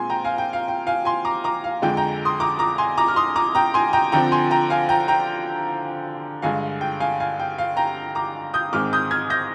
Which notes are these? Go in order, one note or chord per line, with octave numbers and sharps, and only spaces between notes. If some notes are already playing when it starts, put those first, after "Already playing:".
Already playing: A#2 G#3 C4 G#5 C6
G5 A#5
F5 G#5
G5
F5
G5
F5 G#5
G#5 C6
A#5 D6
A#5 D6
F5
F2 D3 G#3 G5
G5 A#5
C6 D#6
A#5 D6
A#5 D6
G#5 C6
A#5 D6
F6
C6 D#6
A#5 D6
G5 A#5
G#5 C6
G5 A#5
D3 F3 C4 G5 A#5
G#5 C6
G5 A#5
F5 G#5
G5 A#5
G5 A#5
G2 D3 G#3 F5 G#5
G5
F5 G#5
F5 G#5
G5
F5
G5 A#5
A#5 D6
D#6 G6
G#2 D#3 G#3 C4 D6 F6
D#6 G6
F6 G#6
G6 A#6